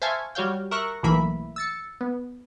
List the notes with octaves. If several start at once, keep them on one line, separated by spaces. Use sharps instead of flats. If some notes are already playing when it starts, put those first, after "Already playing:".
C5 E5 F5 G#5 A5 C#6
G3 F#4 C#5 F5 G5
A#4 E5 C#6 F#6 A#6
B1 A2 E3 A#3 E5 B5
E6 A6 C#7
B3